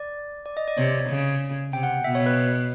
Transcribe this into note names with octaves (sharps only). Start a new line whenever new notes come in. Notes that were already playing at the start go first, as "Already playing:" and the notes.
Already playing: D5
D5
D#5
D5
C3 C#5
C#3
C3 G5
F#5
B2 E5
C#5
B4